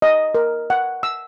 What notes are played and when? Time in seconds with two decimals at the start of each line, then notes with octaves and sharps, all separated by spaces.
0.02 D#5
0.35 A#4
0.70 F#5
1.03 E6